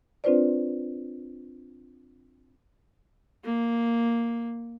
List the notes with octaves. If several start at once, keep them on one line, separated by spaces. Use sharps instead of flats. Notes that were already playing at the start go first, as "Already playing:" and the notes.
C4 D4 F4 B4 C5 D5
A#3